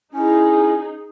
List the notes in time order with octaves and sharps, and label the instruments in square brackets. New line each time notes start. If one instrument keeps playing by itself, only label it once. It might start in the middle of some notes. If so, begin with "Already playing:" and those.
[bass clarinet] C#4 [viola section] D#4 G#4 [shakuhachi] E4